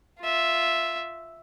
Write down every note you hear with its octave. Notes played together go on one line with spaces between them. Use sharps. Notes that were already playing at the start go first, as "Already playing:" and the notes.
F4 E5